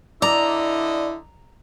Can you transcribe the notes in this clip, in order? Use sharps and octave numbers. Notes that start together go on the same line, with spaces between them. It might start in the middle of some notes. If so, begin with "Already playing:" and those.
D3 E4 D5 D#5 A#5 E6